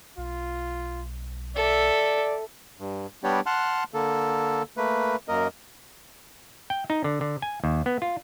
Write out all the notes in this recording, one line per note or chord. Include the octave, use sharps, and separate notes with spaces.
B1 F4
A4 D5 E5
G2
G3 B3 D4 G4 C#5 D5
F#5 A5 C6 F6 F#6
D3 A#3 A4
A3 A#3 B4
F#2 A#3 A#4 D#5
G5
D#4
D3
D3
G#5
D#2
B3
F4